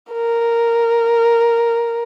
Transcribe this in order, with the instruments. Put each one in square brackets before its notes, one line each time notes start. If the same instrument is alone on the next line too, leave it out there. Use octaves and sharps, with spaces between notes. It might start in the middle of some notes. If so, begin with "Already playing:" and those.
[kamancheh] A#4